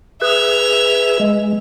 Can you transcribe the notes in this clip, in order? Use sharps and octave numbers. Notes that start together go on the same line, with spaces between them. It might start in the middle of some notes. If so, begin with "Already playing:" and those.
G#4 B4 E5 F7
G#3